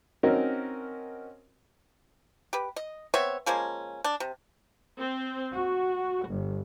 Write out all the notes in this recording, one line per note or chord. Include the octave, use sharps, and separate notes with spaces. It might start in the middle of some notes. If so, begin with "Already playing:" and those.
C4 C#4 D#4 F#4 A#4
G4 B4
D#5
B3 C4 C#5 E5
F3 G#3 A#3 C#4
D4
C3
C4
F#4
G1